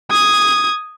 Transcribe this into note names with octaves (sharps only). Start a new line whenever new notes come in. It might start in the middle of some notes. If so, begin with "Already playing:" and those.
D#6 G#6